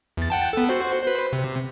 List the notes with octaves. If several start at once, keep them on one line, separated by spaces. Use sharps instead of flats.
E2 A6
F#5 G5 A5
B3 A4
F#4 C5
B4 C5
C3